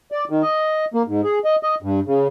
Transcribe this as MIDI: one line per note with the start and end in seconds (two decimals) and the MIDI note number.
0.12 0.24 74
0.30 0.42 51
0.42 0.85 75
0.94 1.03 58
1.07 1.21 44
1.24 1.39 68
1.45 1.56 75
1.63 1.75 75
1.82 2.00 43
2.06 2.27 49